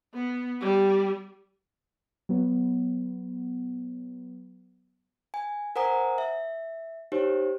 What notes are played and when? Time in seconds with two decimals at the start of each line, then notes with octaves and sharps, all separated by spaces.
0.14 B3
0.61 G3
2.29 F#3 B3
5.34 G#5
5.76 A#4 C5 F#5 G#5 A#5 D#6
6.18 E5
7.12 D#4 G4 C5 C#5